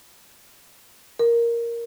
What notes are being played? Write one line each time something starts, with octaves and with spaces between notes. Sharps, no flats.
A#4